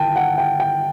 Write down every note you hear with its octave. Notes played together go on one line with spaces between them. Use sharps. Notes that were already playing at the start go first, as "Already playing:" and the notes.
Already playing: G1 D#3 G5 A5
F#5
G5
G5